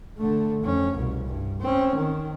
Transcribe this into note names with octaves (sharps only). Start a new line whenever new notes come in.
D3 A3
F2 C#4
C2 B2
G2
C4 C#4
D#3